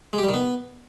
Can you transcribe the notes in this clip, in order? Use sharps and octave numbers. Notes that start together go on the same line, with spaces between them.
G#3
G4
G3
D#3
B3